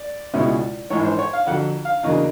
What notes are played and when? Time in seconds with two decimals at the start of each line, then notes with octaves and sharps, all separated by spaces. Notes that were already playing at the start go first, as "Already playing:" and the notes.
Already playing: D5
0.34 C#2 B2 G#3 C#4 E4
0.90 A#1 G#2 E3 C#5
1.05 C5
1.19 C#5
1.33 F5
1.47 F2 D3 F#3 F#5
1.85 F5
2.03 E2 C#3 F#3 A#3 D4 D#5